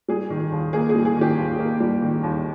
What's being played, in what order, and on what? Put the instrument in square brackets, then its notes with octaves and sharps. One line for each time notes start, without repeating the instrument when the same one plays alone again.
[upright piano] G3 G#4
D#3
D#2
A#3 G#4
G#4
G3
G#4
D#3 G4
D#2
A#3
G3
D#3
D#2